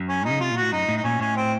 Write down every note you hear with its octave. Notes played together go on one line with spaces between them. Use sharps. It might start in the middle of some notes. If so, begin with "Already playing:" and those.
Already playing: F#2
C#4
C#3 D#4
C3 F4
A#2
A2 F#4
F#2 D#4
A2
D#4
A#2 C#4
A2 C#4
C4